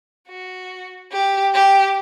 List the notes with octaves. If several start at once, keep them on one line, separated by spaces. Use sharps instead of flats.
F#4
G4
G4